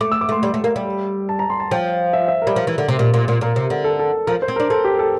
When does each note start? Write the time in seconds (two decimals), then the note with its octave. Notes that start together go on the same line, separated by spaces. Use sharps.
0.01 A3 D6
0.12 E6
0.21 D6
0.29 A3 C6
0.43 G3
0.54 A3
0.64 A#3
0.76 G3
1.29 A5
1.39 A#5
1.50 C6
1.60 A5
1.71 F3 G5
2.13 E5
2.28 E5
2.42 A#4
2.47 G3
2.56 F3
2.67 E3
2.78 D3
2.88 C3
2.99 A#2
3.14 A#2
3.28 A#2
3.41 A#2 A#4
3.56 C3
3.70 D3
3.84 A4
3.99 A4
4.27 F3 A#4
4.42 C5
4.48 C4
4.56 A#4
4.60 D4
4.70 C4 A4
4.84 G4
4.99 A4